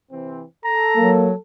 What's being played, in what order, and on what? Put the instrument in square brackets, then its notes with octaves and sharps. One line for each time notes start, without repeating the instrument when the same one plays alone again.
[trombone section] C3 E3 C4
[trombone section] A4 [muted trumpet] A#5
[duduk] F#3 [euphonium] A#3